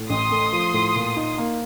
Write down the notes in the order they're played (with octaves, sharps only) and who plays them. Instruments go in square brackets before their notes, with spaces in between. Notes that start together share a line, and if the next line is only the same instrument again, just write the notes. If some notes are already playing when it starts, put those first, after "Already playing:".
Already playing: [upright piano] A2
[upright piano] A1 [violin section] C6 D#6
[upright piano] A3
F3
A2
A#2
D#4
A#3